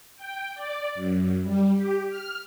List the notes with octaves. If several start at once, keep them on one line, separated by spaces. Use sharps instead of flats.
G5
D5
F#2
G3
G4
F6